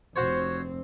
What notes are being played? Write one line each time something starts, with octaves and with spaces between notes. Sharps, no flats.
F1 C4 F#4 C5 C#5